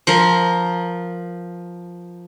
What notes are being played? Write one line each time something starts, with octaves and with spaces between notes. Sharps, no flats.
F3 A#4